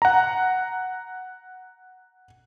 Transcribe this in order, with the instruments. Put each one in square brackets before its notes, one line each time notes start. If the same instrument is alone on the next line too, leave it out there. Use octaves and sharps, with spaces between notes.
[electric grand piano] F#5 A#5